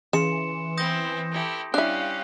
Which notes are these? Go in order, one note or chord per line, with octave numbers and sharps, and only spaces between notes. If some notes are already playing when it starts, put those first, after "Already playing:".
C#3 E3 C6 C#7 E7
B3 C4 E4 D#6 G6 A#6
E4 G4 A4
G3 C#4 D4 E4 G4 F5 F#6